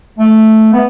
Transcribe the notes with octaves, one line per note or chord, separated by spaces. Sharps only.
A3
B3